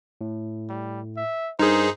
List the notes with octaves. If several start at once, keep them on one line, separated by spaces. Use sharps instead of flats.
A2
G3
E5
G2 D#4 G#4 A#4 C5 G#6